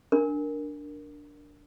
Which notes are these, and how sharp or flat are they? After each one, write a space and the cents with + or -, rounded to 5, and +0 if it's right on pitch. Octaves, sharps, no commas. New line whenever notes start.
D4 +0 A#4 +0